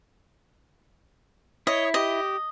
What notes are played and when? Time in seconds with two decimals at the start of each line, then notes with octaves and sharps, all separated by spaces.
1.67 E4 C#5 D#5
1.94 G4 D#5